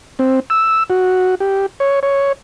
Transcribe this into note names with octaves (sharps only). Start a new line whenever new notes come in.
C4
E6
F#4
G4
C#5
C#5